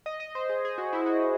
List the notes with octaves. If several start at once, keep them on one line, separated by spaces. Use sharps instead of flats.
D#5
D#5
C5
G#4
G#4
F#4
E4
F#4